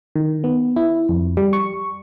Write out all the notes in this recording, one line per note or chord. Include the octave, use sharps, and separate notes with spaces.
D#3
B3
E4
F2
G3
C#6